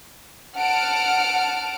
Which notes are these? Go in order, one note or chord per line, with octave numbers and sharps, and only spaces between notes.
F#5 A5 F6 D7